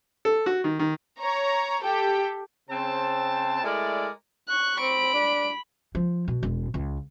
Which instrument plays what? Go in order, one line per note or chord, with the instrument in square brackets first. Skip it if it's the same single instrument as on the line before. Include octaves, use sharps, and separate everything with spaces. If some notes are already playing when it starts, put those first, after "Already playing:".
[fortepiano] A4
F#4
D#3
D#3
[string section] C#5 A#5
G4 A4 G5
[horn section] C#3 C4 A5
G#3 A3 E4 A#4 D5
[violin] C#6 F#6
[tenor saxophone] C4 [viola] B5 [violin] D7
[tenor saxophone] D4
[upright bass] F3
B2
E1
C#2